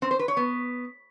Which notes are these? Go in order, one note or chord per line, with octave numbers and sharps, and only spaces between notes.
C4
C5
B4
C#5
B3